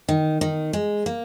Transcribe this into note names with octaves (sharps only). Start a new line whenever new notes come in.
D#3
D#3
G#3
A#3